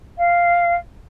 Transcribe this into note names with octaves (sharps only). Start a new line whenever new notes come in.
F5